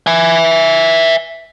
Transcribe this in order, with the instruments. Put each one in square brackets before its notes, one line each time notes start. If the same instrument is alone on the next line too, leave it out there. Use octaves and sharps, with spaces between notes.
[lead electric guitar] E5 G#5